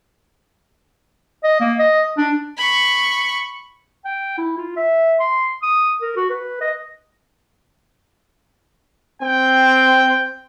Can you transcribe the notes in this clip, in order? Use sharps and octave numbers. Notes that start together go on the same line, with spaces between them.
D#5
A#3
D#5
D4
B5 C#6
G5
E4
F4
E5
C6
D#6
A#4
F#4
B4
D#5
C4 G5